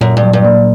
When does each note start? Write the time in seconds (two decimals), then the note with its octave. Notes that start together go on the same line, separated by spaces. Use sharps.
0.01 F#2 A#2
0.17 G2
0.23 F#3
0.33 G2
0.45 A#3